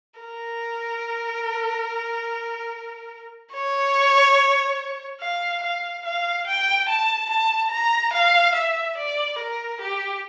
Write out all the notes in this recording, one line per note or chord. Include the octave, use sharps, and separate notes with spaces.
A#4
C#5
F5
F5
F5
G5
A5
A5
A#5
F5
E5
D5
A#4
G4